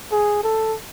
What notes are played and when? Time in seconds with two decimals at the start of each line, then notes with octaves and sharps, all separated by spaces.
0.12 G#4
0.43 A4